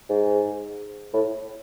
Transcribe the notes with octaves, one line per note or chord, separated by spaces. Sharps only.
G#2
A2